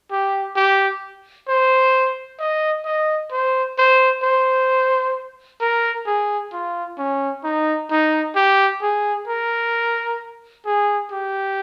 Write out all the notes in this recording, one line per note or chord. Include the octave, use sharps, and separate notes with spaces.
G4
G4
C5
D#5
D#5
C5
C5
C5
A#4
G#4
F4
C#4
D#4
D#4
G4
G#4
A#4
G#4
G4